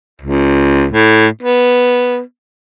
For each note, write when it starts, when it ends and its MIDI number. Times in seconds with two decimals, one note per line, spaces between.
0.21 0.85 37
0.91 1.27 45
1.43 2.20 59